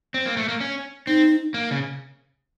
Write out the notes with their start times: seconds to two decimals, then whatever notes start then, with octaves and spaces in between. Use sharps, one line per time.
0.14 C4
0.26 A#3
0.37 A3
0.48 A#3
0.60 C#4
1.07 C4 D#4
1.54 A#3
1.71 C#3